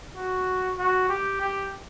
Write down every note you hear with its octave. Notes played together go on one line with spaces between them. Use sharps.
F#4
F#4
G4
G4